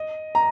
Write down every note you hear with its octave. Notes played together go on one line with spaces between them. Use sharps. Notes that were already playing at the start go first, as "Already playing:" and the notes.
Already playing: D#5
A#5